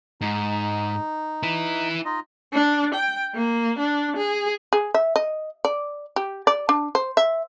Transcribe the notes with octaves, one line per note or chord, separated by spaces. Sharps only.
G#2 D#4
E4 B4
D#4 F4 D#5
D4
G5
A#3
D4
G#4
G#4
E5
D#5
D5
G4
D5
D4
C5
E5